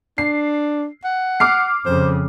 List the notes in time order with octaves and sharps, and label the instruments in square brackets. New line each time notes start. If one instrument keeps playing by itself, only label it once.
[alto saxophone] D4 [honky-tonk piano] C7
[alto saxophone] F#5
[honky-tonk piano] D6 F6 C7
[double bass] F2 C#3 [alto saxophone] C5